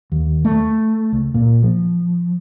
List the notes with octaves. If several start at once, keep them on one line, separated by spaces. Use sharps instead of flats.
D#2
A3
C#2
A#2
F3